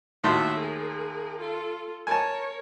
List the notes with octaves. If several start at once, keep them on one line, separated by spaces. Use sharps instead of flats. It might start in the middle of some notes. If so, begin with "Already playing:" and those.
D#2 A2 F#4 E5 C6
G#4 A#4
F4 A4
A#4 C#5 G#5 A5